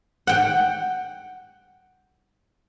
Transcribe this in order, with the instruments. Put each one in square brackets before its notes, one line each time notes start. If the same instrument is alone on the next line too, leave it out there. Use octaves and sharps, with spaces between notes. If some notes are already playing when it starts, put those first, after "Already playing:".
[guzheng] F#5 G5